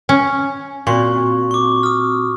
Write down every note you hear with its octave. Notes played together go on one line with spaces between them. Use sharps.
C#4
A#2 C4 F#4 C6 C#6
C#6 D6
D#6 F6